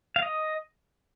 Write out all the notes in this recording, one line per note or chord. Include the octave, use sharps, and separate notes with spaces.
F5
D#5